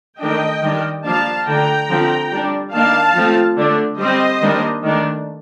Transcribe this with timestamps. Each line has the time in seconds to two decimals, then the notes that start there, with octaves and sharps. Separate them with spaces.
0.19 D#3 A3 D4 D#5 G5
0.62 D#3 G3 D4
1.04 F3 A#3 D4 F5 A5
1.46 D3 A3 D4 G5 A#5
1.88 D3 F3 C4
2.31 G3 D4
2.73 D#3 A#3 D4 F5 A5
3.15 F3 A3 C4
3.57 D3 A3 D4
3.99 G3 C4 C5 D#5
4.41 D#3 G3 A#3 D4
4.83 D#3 A3 D4